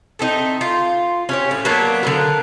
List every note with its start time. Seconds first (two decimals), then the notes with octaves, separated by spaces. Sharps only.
0.19 A3 C4 D#4
0.61 F4
1.29 C#4 G4 C#5
1.51 A2
1.65 F#3 A#3 B3 D4
2.03 D3 B3 A#4